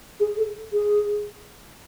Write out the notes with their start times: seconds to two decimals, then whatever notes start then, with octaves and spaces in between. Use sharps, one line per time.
0.20 G#4
0.37 A4
0.73 G#4